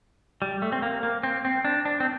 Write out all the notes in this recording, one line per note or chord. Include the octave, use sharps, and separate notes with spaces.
G3
A3
C4
A#3
A#3
C4
C4
D4
D4
C4